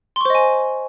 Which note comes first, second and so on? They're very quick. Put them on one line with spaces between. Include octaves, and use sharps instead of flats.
C6 C#6 C5 D#5 G#5